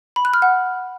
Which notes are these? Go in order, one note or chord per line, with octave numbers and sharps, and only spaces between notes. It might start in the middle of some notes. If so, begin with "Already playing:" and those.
B5
F#6
F6
F#5